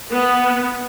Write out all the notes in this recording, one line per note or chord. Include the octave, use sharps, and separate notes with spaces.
B3